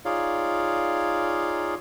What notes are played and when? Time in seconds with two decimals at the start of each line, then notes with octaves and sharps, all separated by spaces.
0.05 D#4 F4 G#4 C#5 D5 F5